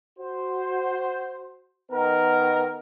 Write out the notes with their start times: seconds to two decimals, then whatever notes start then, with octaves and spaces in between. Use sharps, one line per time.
0.19 F#4 C5
1.92 D#3 B3 A#4